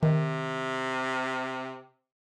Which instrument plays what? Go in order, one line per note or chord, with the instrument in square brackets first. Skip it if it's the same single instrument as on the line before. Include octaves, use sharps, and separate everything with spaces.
[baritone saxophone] C3 [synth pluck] D#3